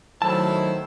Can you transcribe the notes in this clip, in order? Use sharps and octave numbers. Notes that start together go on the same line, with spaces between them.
D#3 F#3 A3 E4 C5 A5